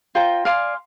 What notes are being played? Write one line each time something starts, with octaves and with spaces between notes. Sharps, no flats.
F4 C5 G5 A#5
D5 F5 G#5 C6